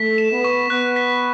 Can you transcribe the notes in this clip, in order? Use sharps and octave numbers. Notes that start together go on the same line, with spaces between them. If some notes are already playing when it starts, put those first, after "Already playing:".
Already playing: A3 B6
E7
B3
C#6
B3 F#6
B6